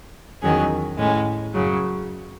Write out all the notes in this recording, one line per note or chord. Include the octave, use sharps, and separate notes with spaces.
E2 D#3 F#3 C#4 G#4
A2 G#3 C#4
F#2 C#3 F#3